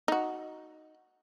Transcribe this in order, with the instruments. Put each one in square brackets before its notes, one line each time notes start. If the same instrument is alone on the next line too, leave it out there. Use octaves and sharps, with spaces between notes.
[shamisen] D#4 F#4